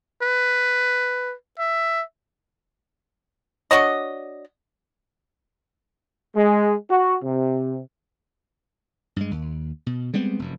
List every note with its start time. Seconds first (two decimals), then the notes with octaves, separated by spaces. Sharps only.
0.22 B4
1.59 E5
3.71 D4 F#4 C#5 D#5
6.36 G#3
6.90 F#4
7.23 C3
9.16 G2 G#3
9.31 D#2
9.86 B2
10.14 G3 G#3 B3 C4
10.39 F1 F#2